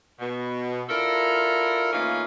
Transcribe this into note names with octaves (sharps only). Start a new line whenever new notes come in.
B2
D4 E4 F4 A4 A#4
E3 A3 A#3 C#4 D#4 F4